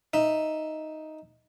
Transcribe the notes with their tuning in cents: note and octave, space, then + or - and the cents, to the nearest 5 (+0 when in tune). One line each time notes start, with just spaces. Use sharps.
D#4 +5 E5 +0